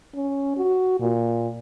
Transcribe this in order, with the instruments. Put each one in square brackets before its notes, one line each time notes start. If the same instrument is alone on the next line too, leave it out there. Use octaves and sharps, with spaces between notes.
[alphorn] C#4
F#4
A#2